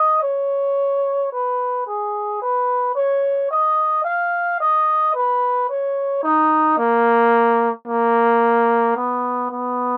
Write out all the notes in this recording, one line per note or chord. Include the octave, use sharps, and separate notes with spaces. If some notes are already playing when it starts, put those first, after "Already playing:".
Already playing: D#5
C#5
B4
G#4
B4
C#5
D#5
F5
D#5
B4
C#5
D#4
A#3
A#3
B3
B3